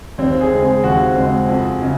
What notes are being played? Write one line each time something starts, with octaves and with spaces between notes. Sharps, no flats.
D#2 C4
G#4
C#3 G#3 C4
G#4
D#2 F#4
C#3 G#3 C4
F2
C#3